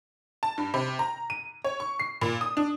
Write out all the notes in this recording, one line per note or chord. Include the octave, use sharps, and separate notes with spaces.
A5
G2
C3
A#5
D#7
C#5
C#6
C7
A#2
D#6
D4